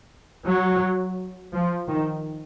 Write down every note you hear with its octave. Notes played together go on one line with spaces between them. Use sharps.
F#3
F3
D#3